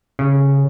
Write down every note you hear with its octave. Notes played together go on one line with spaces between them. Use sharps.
C#3